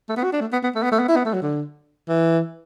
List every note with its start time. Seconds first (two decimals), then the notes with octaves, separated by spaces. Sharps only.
0.09 A3
0.17 B3
0.24 F#4
0.33 D4
0.41 A3
0.53 B3
0.63 B3
0.75 A3
0.83 B3
0.92 A3
0.99 B3
1.08 E4
1.16 B3
1.25 A3
1.34 F#3
1.42 D3
2.09 E3